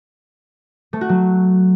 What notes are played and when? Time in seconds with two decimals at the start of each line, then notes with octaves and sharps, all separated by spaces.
0.93 A3
1.01 F#4
1.09 F#3